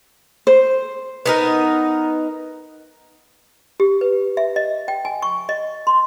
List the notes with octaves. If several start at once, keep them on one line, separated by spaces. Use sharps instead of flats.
C5
B3 D#4 A#4
G4
B4
E5
D#5
G5
G#5
C#6
D#5
C6